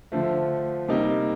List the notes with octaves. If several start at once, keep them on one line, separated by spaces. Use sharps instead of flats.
D3 F3 A3
C3 G3 A#3 D#4